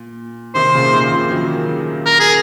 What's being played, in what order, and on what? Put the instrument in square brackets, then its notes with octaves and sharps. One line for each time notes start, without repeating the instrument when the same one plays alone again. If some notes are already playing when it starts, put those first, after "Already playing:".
Already playing: [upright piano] A#2
[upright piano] C3 D#3 [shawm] C5
[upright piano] A#2 C#3
C3 D#3
C#3 F3
D#3 F#3
[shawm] A#4
G#4